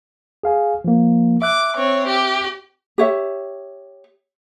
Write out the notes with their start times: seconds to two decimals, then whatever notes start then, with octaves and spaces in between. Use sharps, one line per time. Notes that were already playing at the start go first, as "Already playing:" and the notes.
0.43 G#4 F5 G#5
0.84 F3 A#3
1.42 E5 D6 F#6
1.76 C4 C#5
2.07 G4
2.98 G4 C#5 E5